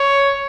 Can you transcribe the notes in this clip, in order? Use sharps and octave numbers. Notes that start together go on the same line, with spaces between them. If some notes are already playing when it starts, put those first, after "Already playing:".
Already playing: C#5